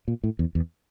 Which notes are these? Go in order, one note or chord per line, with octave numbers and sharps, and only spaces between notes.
A#2
A2
E2
E2